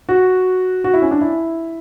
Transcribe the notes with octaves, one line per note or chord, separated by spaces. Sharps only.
F#4
F#4
E4
C#4
D4
E4